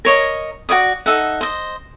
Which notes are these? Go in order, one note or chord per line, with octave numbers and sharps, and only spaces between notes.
A#4 C#5 D#5
F#4 C#5 D5 D#6
D#4 A4 E5 F#5
C5 D#5